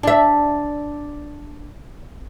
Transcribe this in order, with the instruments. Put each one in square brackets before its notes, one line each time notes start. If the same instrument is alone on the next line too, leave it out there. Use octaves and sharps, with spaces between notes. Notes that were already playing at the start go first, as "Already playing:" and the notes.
[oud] D4 E5